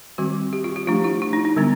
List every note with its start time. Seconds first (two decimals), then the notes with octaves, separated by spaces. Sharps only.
0.18 D#3 G3 C4 F#4
0.53 G4
0.64 F4
0.76 G4
0.87 F3 A3 D4 F4
1.04 E4
1.22 E4
1.33 D#4
1.45 D#4
1.56 D3 G3 B3 D4